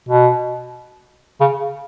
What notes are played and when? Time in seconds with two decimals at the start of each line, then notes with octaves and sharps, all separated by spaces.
0.09 B2
1.41 C#3